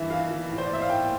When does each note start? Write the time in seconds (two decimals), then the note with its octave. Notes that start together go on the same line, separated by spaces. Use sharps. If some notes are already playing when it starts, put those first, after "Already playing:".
Already playing: G2 E3 E5
0.10 E3 F5
0.31 E3
0.50 A2
0.58 C5
0.66 D5
0.70 A2 E5
0.82 F5
0.90 A2 G5